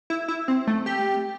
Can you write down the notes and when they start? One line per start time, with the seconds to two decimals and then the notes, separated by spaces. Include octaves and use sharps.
0.10 E4
0.28 E4
0.48 C4
0.67 A3
0.86 G4